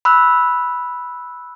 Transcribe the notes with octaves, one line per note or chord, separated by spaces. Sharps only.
B5 E6 F#6